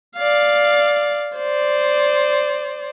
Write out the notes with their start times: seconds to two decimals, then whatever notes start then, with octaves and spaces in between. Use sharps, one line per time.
0.16 D5 F5
1.36 C5 D5